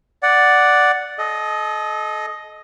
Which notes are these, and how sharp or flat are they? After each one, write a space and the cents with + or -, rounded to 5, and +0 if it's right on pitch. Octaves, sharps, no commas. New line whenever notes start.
D5 +0 F#5 +0
A4 -35 D#5 +0